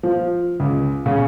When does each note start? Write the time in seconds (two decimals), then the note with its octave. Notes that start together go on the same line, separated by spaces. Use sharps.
0.03 F3
0.60 C#2
1.06 C#3